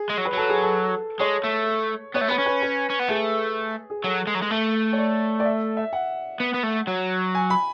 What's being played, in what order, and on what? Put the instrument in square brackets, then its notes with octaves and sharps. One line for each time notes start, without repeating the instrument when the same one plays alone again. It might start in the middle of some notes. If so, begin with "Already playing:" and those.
Already playing: [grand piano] G#4
[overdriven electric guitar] G#3
F#3
[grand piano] B4
[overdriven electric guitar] F#3 [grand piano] A4
[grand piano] G#4
A4
[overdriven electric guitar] G#3 [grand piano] C#5
[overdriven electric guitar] A3
[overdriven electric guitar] B3 [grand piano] C#5
[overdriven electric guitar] A3
[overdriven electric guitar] B3 [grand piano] B4
[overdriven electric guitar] C#4
[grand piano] B4
B4
[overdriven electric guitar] C#4
B3
[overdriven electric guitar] A3 [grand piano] G#4
[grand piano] G#4
[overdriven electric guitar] F#3 [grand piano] A4
[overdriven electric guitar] G#3
F#3
G#3
[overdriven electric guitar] A3 [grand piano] A4
[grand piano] C#5
D5
D5
E5
E5
F#5
[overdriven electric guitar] B3
B3
A3
F#3
[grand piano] G#5
B5